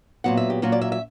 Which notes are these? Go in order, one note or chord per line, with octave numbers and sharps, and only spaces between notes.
A#2 F#3 B3 F#5
E5
G4
A#2 F#3 C#4 F#4
D5
E5
E5